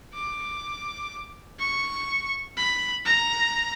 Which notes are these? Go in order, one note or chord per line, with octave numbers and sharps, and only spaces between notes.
D6
C#6
B5
A#5